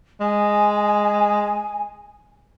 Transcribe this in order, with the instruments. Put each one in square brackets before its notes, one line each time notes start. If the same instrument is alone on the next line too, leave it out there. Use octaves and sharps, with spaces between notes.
[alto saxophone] G#3 [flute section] G#5